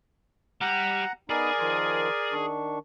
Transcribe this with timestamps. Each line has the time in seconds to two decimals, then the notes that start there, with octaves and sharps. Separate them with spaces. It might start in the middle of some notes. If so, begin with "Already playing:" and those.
0.61 G3 G4 F#5 A#5
1.29 B3 D#4 G#4 A#4 D5 G#5 B5
1.60 D#3 F3 C6
2.33 D#3 D4 C#6